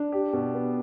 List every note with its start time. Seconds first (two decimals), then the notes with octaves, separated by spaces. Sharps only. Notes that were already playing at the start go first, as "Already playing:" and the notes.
Already playing: D4
0.12 G4
0.33 B2
0.54 B3